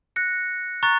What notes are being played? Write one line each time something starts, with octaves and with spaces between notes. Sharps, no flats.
F#6 A#6 C#7
A#5 C#6 F#6 A6